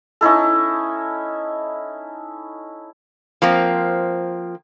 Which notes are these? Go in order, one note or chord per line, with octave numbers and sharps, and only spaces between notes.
C#4 D#4 E4 A4
F3 A#3 C4